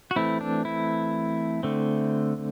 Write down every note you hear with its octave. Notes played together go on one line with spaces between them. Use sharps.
F#4
E3 A3 C4 E4
D4
E4
D3 A3 C4